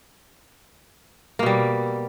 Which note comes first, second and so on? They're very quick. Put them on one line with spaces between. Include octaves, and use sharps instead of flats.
A#3 B2 G3